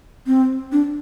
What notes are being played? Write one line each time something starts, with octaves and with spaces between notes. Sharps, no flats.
C4
D4